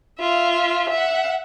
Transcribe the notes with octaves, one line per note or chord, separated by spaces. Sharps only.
F4 E5
E5 F#5